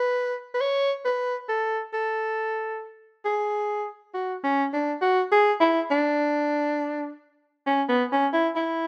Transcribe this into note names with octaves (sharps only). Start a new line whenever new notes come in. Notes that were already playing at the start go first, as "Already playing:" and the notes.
Already playing: B4
B4
C#5
B4
A4
A4
G#4
F#4
C#4
D4
F#4
G#4
E4
D4
C#4
B3
C#4
E4
E4